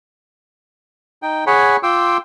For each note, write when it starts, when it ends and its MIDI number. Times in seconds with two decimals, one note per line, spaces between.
1.23 1.45 63
1.23 1.45 79
1.47 1.77 68
1.47 1.77 73
1.47 1.77 78
1.47 1.77 80
1.47 1.77 83
1.83 2.17 65
1.83 2.17 79
1.83 2.17 84
1.83 2.17 86
1.83 2.17 88